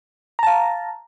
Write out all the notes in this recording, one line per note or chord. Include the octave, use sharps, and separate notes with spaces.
F5 A5 A#5